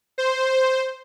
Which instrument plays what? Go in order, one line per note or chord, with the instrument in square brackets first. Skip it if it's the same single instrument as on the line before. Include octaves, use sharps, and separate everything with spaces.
[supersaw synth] C5